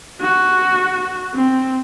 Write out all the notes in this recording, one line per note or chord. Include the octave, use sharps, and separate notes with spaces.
F#4
C4